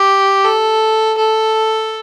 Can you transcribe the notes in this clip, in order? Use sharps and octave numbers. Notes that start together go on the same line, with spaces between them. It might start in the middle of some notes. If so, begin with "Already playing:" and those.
Already playing: G4
A4
A4